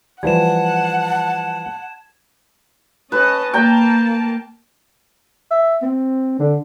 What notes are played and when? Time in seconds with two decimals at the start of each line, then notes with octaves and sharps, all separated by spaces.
0.23 E3 F3 G3 F#5 A5 G#6 E7
3.12 C#4 B4 D#5 A5
3.54 A#3 G5 A5 A#5
5.51 E5
5.82 C4
6.39 D3